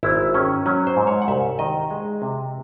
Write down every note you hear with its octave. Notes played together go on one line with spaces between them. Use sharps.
G#1 E4
D#3 C#4
F#3 C#4
C5
G#2
C#5
F#5
C2 E5
D#3 D#5
G#3
C3